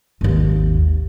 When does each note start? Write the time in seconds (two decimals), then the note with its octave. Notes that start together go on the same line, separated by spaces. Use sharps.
0.21 G#1 D#2